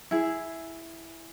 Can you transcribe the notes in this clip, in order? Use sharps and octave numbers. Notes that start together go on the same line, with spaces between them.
E4 G#4